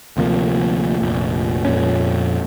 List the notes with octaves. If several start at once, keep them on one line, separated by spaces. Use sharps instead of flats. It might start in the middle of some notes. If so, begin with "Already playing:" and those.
D2 C3 F3 A#3
F1 A#1
F2 A#2 C#4